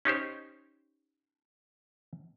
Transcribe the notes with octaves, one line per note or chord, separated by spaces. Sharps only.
C#4 D#4 G4 C5